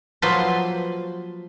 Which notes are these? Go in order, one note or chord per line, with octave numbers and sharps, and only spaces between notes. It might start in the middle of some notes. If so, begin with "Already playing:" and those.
F3 F#3 A#3 A4 B4 C5